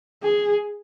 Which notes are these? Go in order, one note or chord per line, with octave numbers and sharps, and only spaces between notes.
G#4